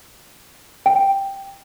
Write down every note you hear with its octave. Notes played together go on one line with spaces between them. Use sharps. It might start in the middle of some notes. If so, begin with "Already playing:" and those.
G5